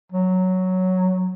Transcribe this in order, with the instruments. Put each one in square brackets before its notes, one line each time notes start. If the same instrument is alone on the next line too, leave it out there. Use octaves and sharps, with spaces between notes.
[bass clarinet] F#3